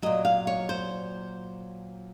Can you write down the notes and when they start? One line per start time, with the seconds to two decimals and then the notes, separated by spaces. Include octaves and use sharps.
0.02 A#2 F#3 D#5
0.25 F5
0.47 C#5
0.69 C5